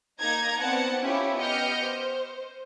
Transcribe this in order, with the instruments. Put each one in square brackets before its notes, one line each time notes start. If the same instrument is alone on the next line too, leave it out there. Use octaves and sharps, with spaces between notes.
[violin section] A#3 D#4 A#5 G#6
B3 C4 D5 F#5 A5
C#4 E4 F4 G4 C#5
B3 G4 D#5 F6 G6 C#7
C5